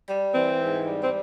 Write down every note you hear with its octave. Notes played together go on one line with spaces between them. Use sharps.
G3
E3 C4
G#2
G3
C4